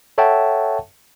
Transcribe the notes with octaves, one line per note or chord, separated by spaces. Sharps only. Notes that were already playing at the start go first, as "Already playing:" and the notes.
A4 C#5 E5 F#5 G5 A5